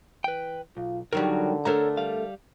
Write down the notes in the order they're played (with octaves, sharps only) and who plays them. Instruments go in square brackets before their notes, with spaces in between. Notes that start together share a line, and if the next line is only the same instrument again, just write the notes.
[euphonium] E3 [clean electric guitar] B4 G5
[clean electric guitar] B1 [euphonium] F4
[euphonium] D3 [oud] D#3 F#3 G3 [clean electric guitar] A#4
[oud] A3 D4 A#4 [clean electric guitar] A4 C#5 A#5
[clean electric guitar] G3 F5